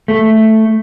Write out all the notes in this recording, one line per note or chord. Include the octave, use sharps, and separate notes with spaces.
A3